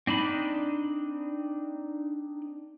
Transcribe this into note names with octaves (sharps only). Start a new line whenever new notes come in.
C4 D4 D#4 B5